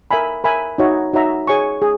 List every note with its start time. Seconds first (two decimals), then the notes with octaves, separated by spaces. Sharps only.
0.11 A#4 E5 G#5 B5
0.44 A#4 E5 G#5 B5
0.78 D#4 F#4 C#5 E5 A#5
1.13 D#4 F#4 C#5 E5 A#5
1.47 G#4 C#5 G#5 C#6
1.82 G#4